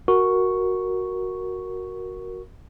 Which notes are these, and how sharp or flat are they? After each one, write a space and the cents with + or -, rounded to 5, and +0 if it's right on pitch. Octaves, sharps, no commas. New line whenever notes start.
F#4 +0 A#4 +0 C#6 +0